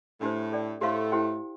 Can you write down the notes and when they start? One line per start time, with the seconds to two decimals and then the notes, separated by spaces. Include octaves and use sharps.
0.21 A2 A3 D4 G4 C5
0.52 A4 D5 G5
0.81 A2 A3 G4 C5 F5 C6
1.12 E4 G4 C5 G5